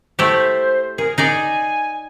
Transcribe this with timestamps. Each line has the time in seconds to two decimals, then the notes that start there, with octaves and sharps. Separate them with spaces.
0.19 A3 E4 G4 C5
0.98 G#4 A#4
1.18 D#4 G#4 D5 G#5